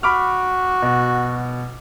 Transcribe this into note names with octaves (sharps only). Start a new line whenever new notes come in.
F#4 B5 D6 F6
B2